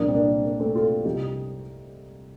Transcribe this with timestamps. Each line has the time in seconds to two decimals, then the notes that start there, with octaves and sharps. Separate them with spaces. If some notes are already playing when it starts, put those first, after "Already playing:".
Already playing: C2 A#2 F3 A#3 D4
0.08 C4
0.15 A#3 D4
0.45 A#3
0.60 A3 C4
0.75 F4 A4
1.05 C2 C3 F3 D#4 G4